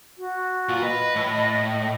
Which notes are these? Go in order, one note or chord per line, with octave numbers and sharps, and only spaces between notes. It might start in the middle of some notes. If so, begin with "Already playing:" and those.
F#4
A#2 F4
B4 D#5
A2